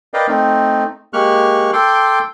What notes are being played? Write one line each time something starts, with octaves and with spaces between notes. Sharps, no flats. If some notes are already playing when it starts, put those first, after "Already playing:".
A#4 B4 D5 D#5 F5 G5
A3 C4 D#4
G#3 A#3 G4 C#6 F6 F#6
A4 G5 C6 D6